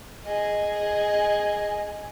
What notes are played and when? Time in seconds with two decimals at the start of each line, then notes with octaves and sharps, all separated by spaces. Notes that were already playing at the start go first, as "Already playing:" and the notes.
0.25 G#4 D#5